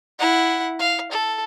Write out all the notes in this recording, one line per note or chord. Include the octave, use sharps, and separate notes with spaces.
E4 F#5
F5
A4